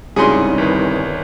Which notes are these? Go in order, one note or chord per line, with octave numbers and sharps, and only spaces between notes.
C2 G#2 C#3 D#4 G#4 C#5 D5 C6
G1 D#3 B4